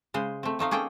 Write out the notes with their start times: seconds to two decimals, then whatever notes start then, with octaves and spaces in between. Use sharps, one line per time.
0.14 C#3 G#3 C5
0.43 A3 C4
0.59 F3 A3 D#4 F5
0.71 A#3 C#4 G#4 A4 G5 A#5